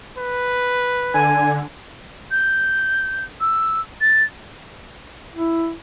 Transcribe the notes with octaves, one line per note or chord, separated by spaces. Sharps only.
B4
D3 G#5
G6
E6
A6
E4